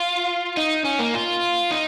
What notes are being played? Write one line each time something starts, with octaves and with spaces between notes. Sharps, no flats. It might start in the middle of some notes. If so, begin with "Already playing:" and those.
Already playing: F4
D#4
C#4
A#3
F4
D#4